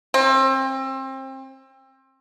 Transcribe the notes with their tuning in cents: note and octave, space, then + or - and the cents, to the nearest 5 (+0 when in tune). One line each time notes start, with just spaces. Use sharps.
C4 +30